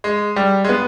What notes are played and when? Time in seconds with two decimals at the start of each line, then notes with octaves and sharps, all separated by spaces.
0.04 G#3
0.36 G3
0.64 G#3
0.69 B3